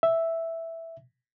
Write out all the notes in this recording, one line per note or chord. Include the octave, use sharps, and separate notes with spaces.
E5